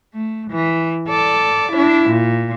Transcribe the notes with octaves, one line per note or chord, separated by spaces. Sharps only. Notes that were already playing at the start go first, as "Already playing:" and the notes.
A3
E3
A4 D5
D4 E4
A#2